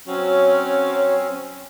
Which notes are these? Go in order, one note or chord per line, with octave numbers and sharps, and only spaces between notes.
F#3 C4 C#4